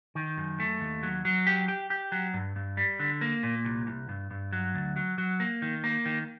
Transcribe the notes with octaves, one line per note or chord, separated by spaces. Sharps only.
D#3
F#2
A3
D#2
F#3
F#3
G4
G4
G4
F#3
G2
G2
G3
D3
A#3
A#2
C2
C2
G2
G2
F#3
D2
F#3
F#3
A#3
D#3
A#3
D#3